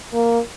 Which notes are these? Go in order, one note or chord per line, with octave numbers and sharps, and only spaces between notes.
A#3